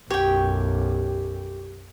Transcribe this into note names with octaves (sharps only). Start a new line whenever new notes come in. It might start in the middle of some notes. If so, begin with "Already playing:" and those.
B1 F#2 G4 C#5 G5